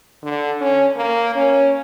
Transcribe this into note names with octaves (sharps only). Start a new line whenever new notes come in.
D3
C#4
A#3
C#4